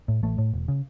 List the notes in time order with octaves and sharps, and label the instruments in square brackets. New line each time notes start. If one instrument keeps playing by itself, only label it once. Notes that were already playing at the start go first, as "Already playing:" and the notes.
[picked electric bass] A2
A1 A3
A2
E1
C#3